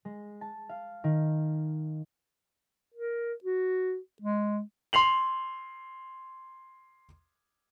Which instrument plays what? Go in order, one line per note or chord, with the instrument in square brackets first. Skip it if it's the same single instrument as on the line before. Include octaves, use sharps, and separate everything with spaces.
[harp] G#3
A5
F5
D#3
[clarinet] A#4
F#4
G#3
[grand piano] C6 C7 F7 F#7